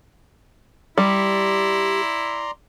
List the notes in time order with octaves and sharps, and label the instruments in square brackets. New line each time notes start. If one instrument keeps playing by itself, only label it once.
[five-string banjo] G3 [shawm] E4 [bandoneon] D5 A#5 C6